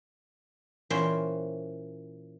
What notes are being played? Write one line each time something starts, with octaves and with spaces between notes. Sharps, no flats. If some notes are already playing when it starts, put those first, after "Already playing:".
A#2 E3 C#4 C5 G5